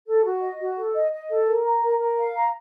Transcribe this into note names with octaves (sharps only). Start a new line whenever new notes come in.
A4
F#4
D#5
F#4
A4
D#5
D#5
A4
A#4
A#5
A#4
A#4
F5
A#5